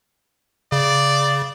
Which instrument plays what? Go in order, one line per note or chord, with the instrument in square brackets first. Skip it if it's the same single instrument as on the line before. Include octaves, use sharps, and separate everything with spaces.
[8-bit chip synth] C#3 [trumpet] D5